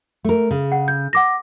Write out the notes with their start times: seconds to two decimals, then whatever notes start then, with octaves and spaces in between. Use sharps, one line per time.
0.24 A3 A#4
0.51 C#3
0.72 F#5
0.88 G6
1.13 F#5 D6 A#6